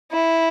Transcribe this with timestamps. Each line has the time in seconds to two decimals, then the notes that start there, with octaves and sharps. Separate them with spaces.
0.12 E4